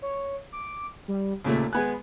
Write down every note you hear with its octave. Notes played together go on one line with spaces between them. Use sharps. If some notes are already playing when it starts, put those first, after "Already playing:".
C#5
D6
G3
D#2 A#2 C#3 A3
G#3 B3 G#5 F#6